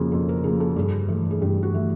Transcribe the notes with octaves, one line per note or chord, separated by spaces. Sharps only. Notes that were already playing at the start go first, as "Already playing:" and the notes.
Already playing: F2 C#3 F3 A#3 F#4 G#4
F2 A4
A#4
C#3 F3 A#3 G#4
A4
G2 G#4
E3 A3
G#4
G2 G4
F#4
E3 A3